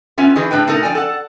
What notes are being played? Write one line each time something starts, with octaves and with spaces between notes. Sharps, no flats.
B3 C#4 F4 E5 G#5
D#3 E3 G#4 B4
A2 D4 B4 G5
B2 A3 D#4 A4 A#4
F3 D5 G5 G#5
A4 F#5